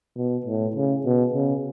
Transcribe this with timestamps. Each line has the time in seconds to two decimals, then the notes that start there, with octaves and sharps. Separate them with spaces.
0.16 B2
0.46 A2
0.76 C#3
1.05 B2
1.34 C#3